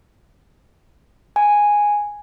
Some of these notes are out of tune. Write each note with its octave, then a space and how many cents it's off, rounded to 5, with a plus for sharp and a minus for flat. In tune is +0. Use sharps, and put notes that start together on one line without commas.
G#5 -5